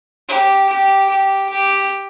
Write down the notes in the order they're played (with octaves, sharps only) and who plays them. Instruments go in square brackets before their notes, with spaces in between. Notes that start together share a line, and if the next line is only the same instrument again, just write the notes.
[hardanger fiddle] G4
G4
G4
G4